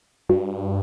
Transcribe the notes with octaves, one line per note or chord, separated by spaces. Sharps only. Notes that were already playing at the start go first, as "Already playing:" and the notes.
G2 F#4